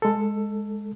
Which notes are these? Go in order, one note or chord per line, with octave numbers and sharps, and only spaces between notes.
G#3 A4